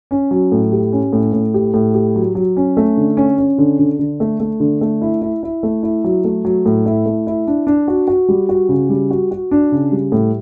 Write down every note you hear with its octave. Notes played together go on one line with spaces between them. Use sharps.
C#4
F#3
A2
G4
C#4
A2
A2
G4
A2
G4
F#3
F#3
C#4
A3
D3
C#4
C#4
D3
D3
D3
A3
A3
D3
A3
E4
E4
E4
A3
E4
F#3
A3
F#3
A2
E4
A3
E4
D4
D4
F#4
F#4
G3
F#4
C#3
G3
F#4
F#4
D4
C#3
G3
A2